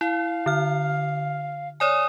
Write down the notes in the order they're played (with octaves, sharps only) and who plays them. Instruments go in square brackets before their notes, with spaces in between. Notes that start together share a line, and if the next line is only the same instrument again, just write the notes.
[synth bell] E4 [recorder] F5
[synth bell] D3 F6
[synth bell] C#5 D5 G#5 [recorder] D#6